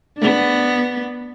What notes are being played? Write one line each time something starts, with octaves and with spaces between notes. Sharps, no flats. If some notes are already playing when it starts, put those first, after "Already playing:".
B3 D4